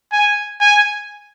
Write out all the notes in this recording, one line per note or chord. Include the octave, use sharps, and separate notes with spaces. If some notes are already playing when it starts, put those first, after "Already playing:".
G#5
G#5